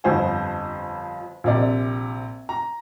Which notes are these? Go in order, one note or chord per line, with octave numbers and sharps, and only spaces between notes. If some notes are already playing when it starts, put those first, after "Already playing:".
G1 F2 C5 G#5
A#1 C3 D5
A#5